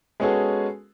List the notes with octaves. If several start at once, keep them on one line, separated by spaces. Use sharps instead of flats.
G#3 B3 C#4 F#4 G#4 A4